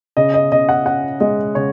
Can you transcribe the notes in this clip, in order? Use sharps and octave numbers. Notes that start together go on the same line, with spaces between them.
C#3 D#5
D#5
C#3 D#5
F#5
C#4 F#5
G#3 D#5
C#3 C#5